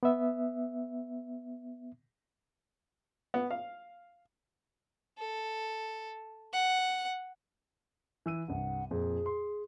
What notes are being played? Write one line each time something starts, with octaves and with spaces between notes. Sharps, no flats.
B3 E5
B3
F5
A4
F#5
E3 E6 D#7
C2 G2 F#5
F2 A#2 G#4
C6